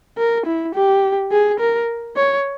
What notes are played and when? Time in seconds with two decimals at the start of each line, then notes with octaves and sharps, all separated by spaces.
0.18 A#4
0.46 E4
0.75 G4
1.32 G#4
1.60 A#4
2.16 C#5